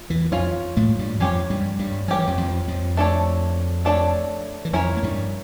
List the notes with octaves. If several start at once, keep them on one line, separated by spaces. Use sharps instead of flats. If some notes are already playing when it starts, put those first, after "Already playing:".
Already playing: F4
E2 E3
F2 F3 C#4 F4 C#5
A2 A3
G2 G3
F2 F3 C#4 G4 C#5
G2 G3
G2 G3
F3 C#4 G4 C#5
E3
F2 F3
F2 F3
F2 F3
A3 D4 A4 C#5
A3 D4 A4 C#5
E3
F2 F3 C#4 E4 A#4 C#5
A3
G2 G3